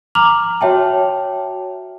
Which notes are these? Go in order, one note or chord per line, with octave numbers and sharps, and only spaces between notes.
A#5 D6 F6 F7 F#7
F#4 C#5 E5 G5 A5